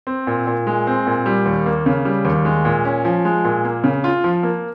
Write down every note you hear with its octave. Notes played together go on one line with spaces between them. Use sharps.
C4
A#2
A#2
G#3
C4
A#2
G3
D#2
A#3
C#3
G3
D#2
G#3
A#2
C#4
F3
G#3
A#2
A#3
C#3
F4
F3
A#3